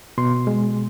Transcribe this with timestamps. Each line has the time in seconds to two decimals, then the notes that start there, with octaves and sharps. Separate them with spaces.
0.18 B2 C6
0.47 G#3